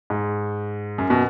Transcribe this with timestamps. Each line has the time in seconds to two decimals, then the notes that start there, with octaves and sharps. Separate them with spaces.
0.10 G#2
0.98 F#2
1.10 B2